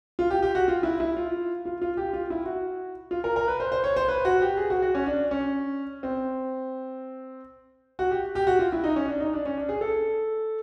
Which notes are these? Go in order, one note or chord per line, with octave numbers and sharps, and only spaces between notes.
F4
G4
G4
F#4
F4
E4
E4
F4
F4
F4
G4
F4
E4
F#4
F4
A#4
A#4
B4
C5
C5
C#5
C5
B4
F#4
G4
G#4
F#4
F#4
C#4
D4
C#4
C4
F#4
G4
G4
F#4
F4
E4
D#4
C#4
D4
D#4
D4
C#4
D4
G#4
A4